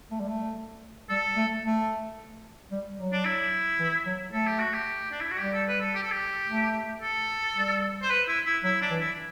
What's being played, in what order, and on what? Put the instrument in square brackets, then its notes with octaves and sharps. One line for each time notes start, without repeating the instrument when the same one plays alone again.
[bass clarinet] A3
G3
A3
[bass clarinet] G3 [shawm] A4
[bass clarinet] A3
A3
G3
F#3
[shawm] D4
E4
[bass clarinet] E3
F#3
[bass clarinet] A3 [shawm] A4
[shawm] G4
F#4
G4
D4
E4
F#4
[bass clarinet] G3 [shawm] G4
[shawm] A4
B4
A4
G4
A4
G4
[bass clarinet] A3
[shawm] A4
[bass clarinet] G3
[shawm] C5
B4
E4
E4
[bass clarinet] F#3 [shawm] E4
[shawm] D4
[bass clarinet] E3
[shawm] E4